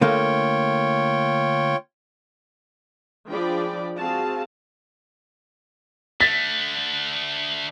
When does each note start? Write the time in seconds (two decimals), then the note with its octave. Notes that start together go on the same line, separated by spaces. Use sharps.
0.01 D3 A3 A#3 F4 C#5 G5
3.28 F3 D4 G#4 D5 G5 B5
3.97 C4 F#4 G#4 F5 A5
6.21 D3 A3 A6 B6